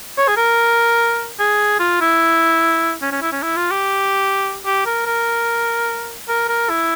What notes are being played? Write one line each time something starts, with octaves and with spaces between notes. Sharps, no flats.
C#5
G#4
A#4
G#4
F4
E4
C#4
C#4
E4
C#4
E4
F4
G4
G4
A#4
A#4
A#4
A#4
E4